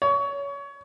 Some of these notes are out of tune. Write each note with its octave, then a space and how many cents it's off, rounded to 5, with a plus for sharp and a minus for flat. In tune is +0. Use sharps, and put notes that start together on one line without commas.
C#5 +25